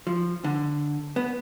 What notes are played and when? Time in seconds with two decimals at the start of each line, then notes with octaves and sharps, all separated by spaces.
0.07 F3
0.44 D3
1.16 B3